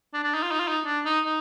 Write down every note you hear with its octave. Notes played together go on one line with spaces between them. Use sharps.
D4
D4
D#4
F4
D#4
F4
D#4
D4
D#4
D#4